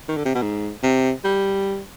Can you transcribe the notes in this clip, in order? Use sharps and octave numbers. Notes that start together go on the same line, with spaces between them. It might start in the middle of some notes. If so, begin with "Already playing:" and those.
D#3
D3
C3
B2
G#2
C3
G3